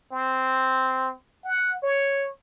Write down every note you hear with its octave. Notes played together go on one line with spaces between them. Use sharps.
C4
F#5
C#5